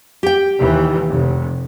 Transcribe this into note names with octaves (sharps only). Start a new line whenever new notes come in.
G4 G5
D#2 E3
F1